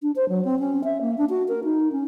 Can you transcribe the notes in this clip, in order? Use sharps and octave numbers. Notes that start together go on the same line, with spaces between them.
D4
C5
F#3
C4
C#4
E5
A#3
D4
F#4
A#4
D#4
C#4